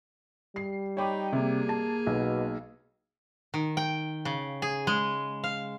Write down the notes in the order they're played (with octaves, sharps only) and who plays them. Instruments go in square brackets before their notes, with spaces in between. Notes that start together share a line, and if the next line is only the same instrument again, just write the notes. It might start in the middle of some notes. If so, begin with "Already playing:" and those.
[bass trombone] G3 [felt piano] C7
[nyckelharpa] D#4 B5 [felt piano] C#5 G5 D6
[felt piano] C3 [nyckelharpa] A#3 G#4
[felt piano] A5
[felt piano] B1 [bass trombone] B2
[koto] D#3
G5
C#3
G#4
G#3
F5